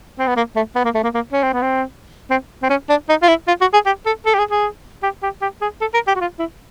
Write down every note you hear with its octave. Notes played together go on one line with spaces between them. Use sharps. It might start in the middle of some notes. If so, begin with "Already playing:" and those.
C4
B3
A#3
A3
B3
A#3
A3
A#3
A#3
C#4
C4
B3
C4
C4
C4
C#4
D4
D#4
F4
E4
F4
F#4
G#4
G4
A4
A4
G4
G#4
G#4
G4
G4
G4
G#4
A4
A#4
G4
F#4
F4
E4